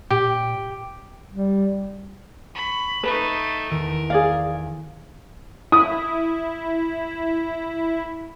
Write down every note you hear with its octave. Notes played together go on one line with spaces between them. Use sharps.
A#2 G4
G3
B5 C#6 B6
A3 D#4 B4
E2 D#3 A4 A#4
G#4 D5 F5
E4 D#6